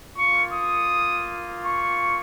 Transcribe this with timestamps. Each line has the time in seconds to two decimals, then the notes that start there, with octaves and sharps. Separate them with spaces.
0.15 A#3 F4 C#6
0.53 D#6
1.64 C#6